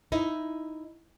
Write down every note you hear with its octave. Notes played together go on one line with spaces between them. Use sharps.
D#4 E4